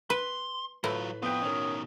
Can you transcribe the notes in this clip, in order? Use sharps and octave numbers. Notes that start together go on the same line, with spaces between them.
B4 C6
A2 F#3 E4 F4 B4 B5
F2 B3 F4 G5 D#6
B2 D#3 C#4 A#4